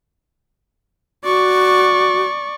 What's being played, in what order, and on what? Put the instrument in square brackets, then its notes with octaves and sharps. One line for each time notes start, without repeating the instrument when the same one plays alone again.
[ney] F#4 [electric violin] D5 C#6